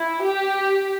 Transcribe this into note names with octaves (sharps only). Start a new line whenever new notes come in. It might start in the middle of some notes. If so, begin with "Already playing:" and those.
Already playing: E4
G4